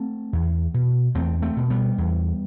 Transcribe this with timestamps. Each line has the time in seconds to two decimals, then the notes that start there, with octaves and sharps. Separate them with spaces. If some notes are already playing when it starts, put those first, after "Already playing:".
Already playing: A3 C4
0.33 E2
0.74 B2
1.15 E2 A3 C4
1.42 A3 C4
1.57 B2
1.70 G3 B3
1.98 E2